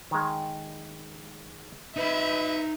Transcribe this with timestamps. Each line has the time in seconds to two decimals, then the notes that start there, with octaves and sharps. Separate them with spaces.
0.11 D#3 G#3
1.97 D#4 B4 E5 B5